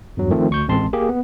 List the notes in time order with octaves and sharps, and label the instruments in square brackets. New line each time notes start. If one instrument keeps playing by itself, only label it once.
[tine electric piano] E2 G2 F#3
D#3 F3 A3 C4
D2 C#6 G6
A1 G#3 C4 A5 C6
A#3 G4 G#4
B3